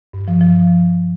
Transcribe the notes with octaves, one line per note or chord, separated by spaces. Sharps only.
G2
F3
F3